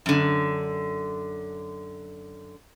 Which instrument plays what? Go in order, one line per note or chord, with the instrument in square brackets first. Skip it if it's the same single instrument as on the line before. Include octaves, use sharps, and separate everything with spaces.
[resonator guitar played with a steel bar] F#2 D3